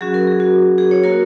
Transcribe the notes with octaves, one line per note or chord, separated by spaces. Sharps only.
F#3 C#4 F#4 G#4
A#4
G#4
F#4
G#4
C#5
A#3 F#4 A#4